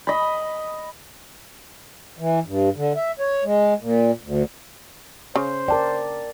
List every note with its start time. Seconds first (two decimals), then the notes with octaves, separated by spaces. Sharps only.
0.07 D#5 B5
2.18 E3
2.45 G2
2.76 D3
2.96 E5
3.19 C#5
3.44 G#3
3.80 A#2
4.23 D2
5.36 C#3 C5
5.68 A#4 D5 G5 A5